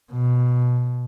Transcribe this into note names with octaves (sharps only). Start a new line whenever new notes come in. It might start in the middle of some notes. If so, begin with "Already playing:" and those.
B2